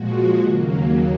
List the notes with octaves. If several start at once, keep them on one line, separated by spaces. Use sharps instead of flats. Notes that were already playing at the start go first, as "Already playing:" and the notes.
Already playing: A#2 F3 G#3 F#4
D#2 C#3 F#3 A#3